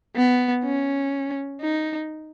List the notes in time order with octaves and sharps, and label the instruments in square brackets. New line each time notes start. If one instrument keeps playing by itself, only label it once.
[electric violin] B3
C#4
D#4